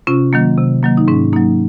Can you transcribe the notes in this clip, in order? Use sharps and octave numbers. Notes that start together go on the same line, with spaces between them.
C3 C#4 F4
D#3 F#3 A#3
C3
D#3 F#3 A#3
D#4
G#2 C#4
F#3 A#3 D#4